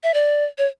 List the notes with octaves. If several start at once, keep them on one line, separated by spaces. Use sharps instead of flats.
E5
D5
C#5